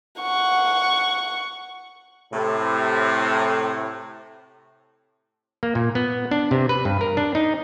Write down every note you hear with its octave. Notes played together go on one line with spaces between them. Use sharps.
F#5 C#6
A2 C3
A#3
A#2
B3
D4
C3
B4
G2
A#4
D4
D#4